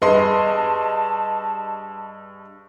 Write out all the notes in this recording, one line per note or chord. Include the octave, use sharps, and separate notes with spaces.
G2 G#4 B4 D#5 A5 C6